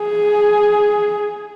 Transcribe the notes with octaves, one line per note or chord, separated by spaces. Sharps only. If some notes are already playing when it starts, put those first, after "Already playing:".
Already playing: G#4